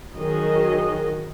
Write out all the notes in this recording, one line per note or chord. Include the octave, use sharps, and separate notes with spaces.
D#3 F#3 F#4 G#4 D#5